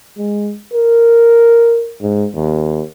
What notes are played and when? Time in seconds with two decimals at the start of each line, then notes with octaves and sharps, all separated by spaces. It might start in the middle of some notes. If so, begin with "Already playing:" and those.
0.18 G#3
0.73 A#4
2.02 G#2
2.35 D#2